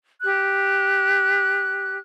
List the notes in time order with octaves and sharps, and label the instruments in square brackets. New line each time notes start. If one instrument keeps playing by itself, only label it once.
[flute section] G4 F#6